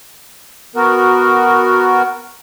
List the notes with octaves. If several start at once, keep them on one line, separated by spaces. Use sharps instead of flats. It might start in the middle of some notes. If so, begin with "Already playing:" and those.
B3 F#4 A#4